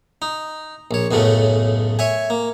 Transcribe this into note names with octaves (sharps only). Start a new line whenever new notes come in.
D#4
A#1 C#5
B1 F#2 A2 C#3 A3
C#5 E5 G#5
A#3